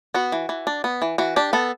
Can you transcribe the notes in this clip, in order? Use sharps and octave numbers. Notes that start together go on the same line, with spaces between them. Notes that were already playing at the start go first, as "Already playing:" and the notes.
B3 F#4
E3
E3
D4
B3
E3
E3 F#4
D4 G4
B3 A4